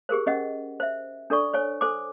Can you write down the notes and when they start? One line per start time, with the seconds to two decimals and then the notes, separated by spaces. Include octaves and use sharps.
0.09 G4 G#4 A#4 C5
0.26 C#4 D#5 F#5
0.80 C5 E5
1.30 D4 A4 D5 C#6
1.53 C5 C#5 G#5
1.81 A4 C5 G#5 D6